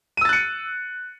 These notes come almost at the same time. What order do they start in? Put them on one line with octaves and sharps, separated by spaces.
D#7 E6 A6 F#6 C#7